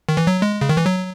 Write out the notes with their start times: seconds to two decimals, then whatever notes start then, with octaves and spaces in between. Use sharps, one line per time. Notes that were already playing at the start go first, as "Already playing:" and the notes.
0.09 D#3
0.17 E3
0.27 F#3
0.42 G#3
0.61 C#3
0.69 D#3
0.77 E3
0.86 F#3